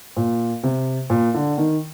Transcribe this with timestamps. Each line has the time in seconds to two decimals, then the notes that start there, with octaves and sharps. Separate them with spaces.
0.16 A#2
0.63 C3
1.10 A#2
1.34 D3
1.58 D#3